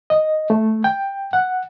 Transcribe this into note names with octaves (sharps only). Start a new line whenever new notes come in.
D#5
A3
G5
F#5